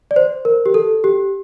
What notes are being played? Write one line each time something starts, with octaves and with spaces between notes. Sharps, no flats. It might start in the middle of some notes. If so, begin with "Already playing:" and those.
D5
C5
A#4
G4
A4
G4